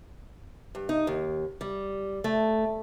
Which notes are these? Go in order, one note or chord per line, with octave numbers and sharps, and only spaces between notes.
G2
D#4
D#2
G3
A3